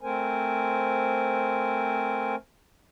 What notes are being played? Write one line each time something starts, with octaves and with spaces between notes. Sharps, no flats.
A3 C4 A#4 C5 G#5